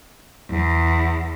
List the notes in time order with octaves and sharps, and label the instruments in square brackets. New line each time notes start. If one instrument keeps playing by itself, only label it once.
[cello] E2